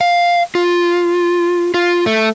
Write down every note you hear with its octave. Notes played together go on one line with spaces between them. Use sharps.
F5
F4
F4
A3